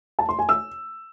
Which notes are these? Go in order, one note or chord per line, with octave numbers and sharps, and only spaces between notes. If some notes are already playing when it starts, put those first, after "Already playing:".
A5
C6
G#5
E6